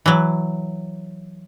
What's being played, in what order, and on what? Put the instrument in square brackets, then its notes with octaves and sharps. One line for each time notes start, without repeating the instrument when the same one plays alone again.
[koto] E3 F#3